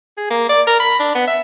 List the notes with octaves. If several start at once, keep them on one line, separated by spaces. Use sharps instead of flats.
G#4
A#3
D5
A#4
B5
D4
B3
E5